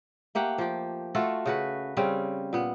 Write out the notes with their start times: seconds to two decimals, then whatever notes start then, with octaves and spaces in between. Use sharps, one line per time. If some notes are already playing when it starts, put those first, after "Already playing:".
0.35 A3 A#3 G4 F#5
0.58 F3 G4
1.15 A3 F4 F#4 A4
1.45 C#3 F#4 B4
1.97 C#3 G3 C4 C#4
2.53 A#2 B3